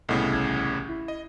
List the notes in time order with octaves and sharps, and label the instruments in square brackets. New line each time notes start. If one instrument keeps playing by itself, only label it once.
[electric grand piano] C2 A2 C#3 [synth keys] B3 A4 D#5
[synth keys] A1 G#6
E4
[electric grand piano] D#5